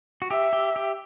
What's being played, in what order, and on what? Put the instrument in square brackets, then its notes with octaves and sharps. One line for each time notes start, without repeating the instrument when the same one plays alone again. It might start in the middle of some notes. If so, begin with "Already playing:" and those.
[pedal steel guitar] F#4
[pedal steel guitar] G4 [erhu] E5
[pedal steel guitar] G4
G4